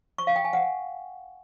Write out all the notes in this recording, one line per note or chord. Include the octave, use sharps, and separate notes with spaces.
C#6
F5
G5
G#5
F#5